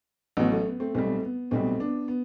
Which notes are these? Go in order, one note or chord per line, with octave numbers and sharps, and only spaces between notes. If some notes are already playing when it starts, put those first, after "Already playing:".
A1 A2 F#3 B3
A3
B3
A3 C4
B1 B2 G3 A3 C4
B3
B1 B2 G3 A3 C4
B3 D4
B3